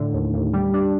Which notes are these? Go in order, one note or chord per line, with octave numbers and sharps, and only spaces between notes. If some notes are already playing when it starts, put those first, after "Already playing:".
Already playing: A2 D3
D#2
D#2
G3
D4